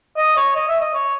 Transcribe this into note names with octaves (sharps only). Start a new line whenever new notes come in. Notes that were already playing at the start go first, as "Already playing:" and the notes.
D#5
C#5
D#5
E5
D#5
C#5